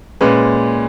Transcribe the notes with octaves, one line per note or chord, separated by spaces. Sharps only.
A#2 G#3 C#4 B4